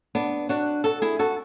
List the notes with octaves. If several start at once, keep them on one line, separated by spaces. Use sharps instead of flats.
B3 D4
D4 F#4
F#4 A4
E4 G#4
F#4 A4